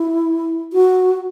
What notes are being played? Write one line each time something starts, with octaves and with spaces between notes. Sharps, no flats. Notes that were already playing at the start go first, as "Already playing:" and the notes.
Already playing: E4
F#4